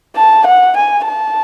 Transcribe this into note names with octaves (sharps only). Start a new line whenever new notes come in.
A5
F#5
G#5
A5